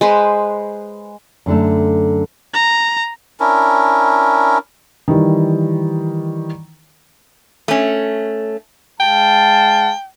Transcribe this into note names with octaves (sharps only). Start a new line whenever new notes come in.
G#3 B4 C5
F#2 D3 A3
A#5
C#4 D4 E4 A#4
D#3 E3 G3
A3 C#4
G#3 F5 G5 A5